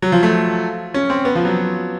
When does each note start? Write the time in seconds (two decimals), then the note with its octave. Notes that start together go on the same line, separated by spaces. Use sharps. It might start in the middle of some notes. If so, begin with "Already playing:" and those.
0.02 F#3
0.12 F3
0.23 A3
0.94 C#4
1.10 C4
1.25 B3
1.35 F3
1.45 F#3